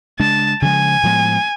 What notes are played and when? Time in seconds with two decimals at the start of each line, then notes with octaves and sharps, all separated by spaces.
0.19 C#3 G#3 D4 A5
0.62 C#3 F3 G#3 G#5
1.03 A2 F3 G#3 B3